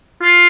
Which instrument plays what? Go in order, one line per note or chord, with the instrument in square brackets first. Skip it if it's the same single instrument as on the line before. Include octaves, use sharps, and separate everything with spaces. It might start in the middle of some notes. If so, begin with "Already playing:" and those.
[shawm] F4